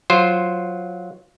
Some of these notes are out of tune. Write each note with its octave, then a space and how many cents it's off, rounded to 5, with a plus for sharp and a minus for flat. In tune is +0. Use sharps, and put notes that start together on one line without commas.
F#3 -10 F4 +0 C5 +0